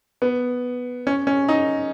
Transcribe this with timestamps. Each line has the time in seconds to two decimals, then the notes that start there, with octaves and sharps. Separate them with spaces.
0.22 B3
1.07 C#4
1.27 C#4
1.49 D#4